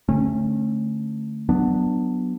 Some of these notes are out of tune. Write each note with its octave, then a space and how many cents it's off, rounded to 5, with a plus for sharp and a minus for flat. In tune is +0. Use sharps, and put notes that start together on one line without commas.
D3 +0 A3 +0 C#4 -35
F#3 +0 B3 +0 D4 +10